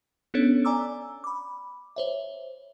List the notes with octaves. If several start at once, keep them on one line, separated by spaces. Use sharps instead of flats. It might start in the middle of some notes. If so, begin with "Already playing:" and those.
B3 C#4 D4 A4 C#5
D5 G#5 A#5 D6 E6
B5 D6
C5 C#5 E5